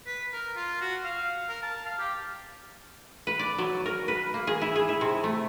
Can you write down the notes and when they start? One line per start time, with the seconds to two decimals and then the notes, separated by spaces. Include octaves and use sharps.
0.06 B4
0.33 A#4
0.56 F4
0.81 F#4
1.04 F5
1.49 A#4
1.62 A5
1.86 F5
1.99 G4
3.27 B4
3.39 D5
3.58 F#3
3.86 A#4
4.08 B4
4.34 A#3
4.47 G#4
4.61 E4
4.76 G#4
4.89 E4
5.01 C3
5.24 A3